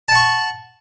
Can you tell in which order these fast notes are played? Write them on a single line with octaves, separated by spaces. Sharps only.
A5 F#5 C#6